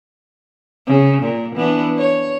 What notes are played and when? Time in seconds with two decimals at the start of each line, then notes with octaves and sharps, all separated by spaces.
0.87 C#3
1.22 A#2
1.55 E3 B3 D4
1.98 C#5